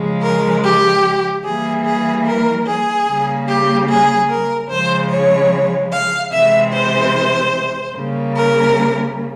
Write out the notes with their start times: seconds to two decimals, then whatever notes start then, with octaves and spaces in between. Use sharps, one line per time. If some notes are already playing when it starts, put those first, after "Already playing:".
Already playing: C#3 F3 G#3
0.23 A#4
0.64 G4
1.45 E3 G3 A#3 G#4
1.86 G#4
2.26 A#4
2.67 G#4
3.08 C#3 G3 A#3
3.49 G4
3.89 G#4
4.30 A#4
4.70 C#3 F3 G#3 C5
5.11 C#5
5.92 F5
6.33 C3 E3 G#3 E5
6.74 C5
7.96 C#3 G3 A#3
8.36 A#4